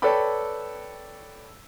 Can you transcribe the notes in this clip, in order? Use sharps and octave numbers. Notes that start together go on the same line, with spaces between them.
A4 B4 C#5 D5 G5 B5